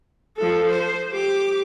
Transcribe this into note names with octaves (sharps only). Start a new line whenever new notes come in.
F3 A4
C5
G4 D6